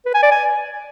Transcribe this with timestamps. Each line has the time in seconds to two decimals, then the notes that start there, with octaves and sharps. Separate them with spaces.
0.06 B4
0.14 G#5
0.23 D5
0.31 G#5